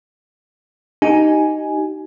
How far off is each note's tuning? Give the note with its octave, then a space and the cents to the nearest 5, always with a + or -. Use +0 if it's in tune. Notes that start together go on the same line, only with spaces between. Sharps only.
D#4 +0 G4 -35 G#5 +5